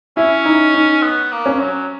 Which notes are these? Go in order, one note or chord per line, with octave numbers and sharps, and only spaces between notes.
C#4 E4
D#4
D#4
B3
A#3
C#4
F#3